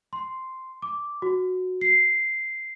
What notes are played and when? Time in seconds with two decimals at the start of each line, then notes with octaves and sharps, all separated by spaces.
0.13 C6
0.82 D6
1.22 F#4
1.81 C7